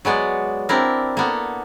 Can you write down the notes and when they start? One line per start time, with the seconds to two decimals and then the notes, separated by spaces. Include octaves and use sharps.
0.05 F#3 G#3 B3 D5
0.69 C4 D4 E4 A#4
1.17 A#3 B3 A4